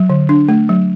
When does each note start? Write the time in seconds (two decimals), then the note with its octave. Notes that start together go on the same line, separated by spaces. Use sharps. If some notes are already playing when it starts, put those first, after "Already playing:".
Already playing: F#3
0.10 D3
0.29 D4
0.49 A3
0.69 F#3